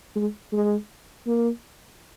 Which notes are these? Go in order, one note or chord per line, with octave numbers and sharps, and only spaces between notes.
G#3
G#3
A#3